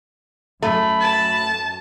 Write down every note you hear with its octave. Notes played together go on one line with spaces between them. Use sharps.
F#2 A3 B5
A5